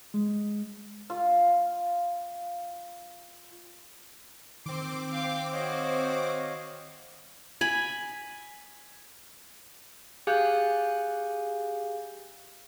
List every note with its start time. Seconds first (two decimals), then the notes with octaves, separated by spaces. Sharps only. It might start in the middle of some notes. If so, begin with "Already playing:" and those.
0.14 G#3
1.10 F4 F5
4.66 D#3 C4 C6 D6
5.10 F5 G5
5.53 F#4 C5 C#5 D#5 F5
7.61 G#5 B5
10.27 G4 G#4 F5 G#5 F#6 G6